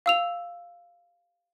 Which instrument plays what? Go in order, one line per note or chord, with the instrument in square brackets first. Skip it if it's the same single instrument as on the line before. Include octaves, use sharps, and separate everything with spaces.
[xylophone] F5 E6 F7